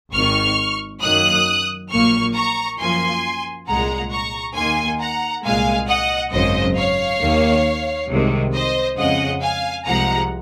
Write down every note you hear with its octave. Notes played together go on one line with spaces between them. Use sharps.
G#1 G#2 D#3 C#6 F6
F#2 D#3 F#3 A#3 D#6 F#6
A#1 A#2 F#3 A#3 C#6 F6
A#5 C#6
F#2 F3 A#3 G#5 C6
C2 A#2 G#3 F#5 A#5
A#5 C#6
D#2 D#3 A#3 G#5 C6
F#5 A#5
C2 A#2 G#3 F5 G#5
D#5 F#5
G#1 F#2 C#3 F#3 C5 D#5
C#5 F5
D#2 D#3 A#3
C2 C3 D#3 G#3
C5 D#5
F2 C#3 G#3 D#5 F#5
F5 G#5
C2 C3 F3 G#3 F#5 A#5